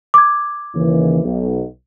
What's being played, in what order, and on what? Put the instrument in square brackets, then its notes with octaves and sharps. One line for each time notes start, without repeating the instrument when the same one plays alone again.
[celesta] D6 G#6
[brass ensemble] D#2 C#3 E3
B1